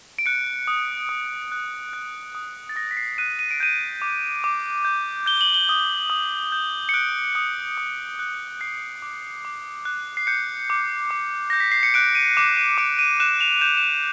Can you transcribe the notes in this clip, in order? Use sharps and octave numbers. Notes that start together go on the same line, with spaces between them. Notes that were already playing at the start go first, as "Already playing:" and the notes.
D7
F#6 C#7
D#6
D#6
F#6
F#6
D#6
A6
D#6 A#6
B6
C7
F#6 D#7
D#7
D7
G6 D#7
D6
D6
G6
G6 G7
F#7
G7
D#6
D#6
G6
C#7
F#6 D7
D#6
D#6
F#6
F#6 C7
D6
D6
F#6
C7
G6 C#7
D6
D6
G6 A#6
B6
C7
C#7
F#6 D7
D#7
D6 E7
D#7
D6 D7
D#7
F#6 E7
F7
G6 E7
E7
D#7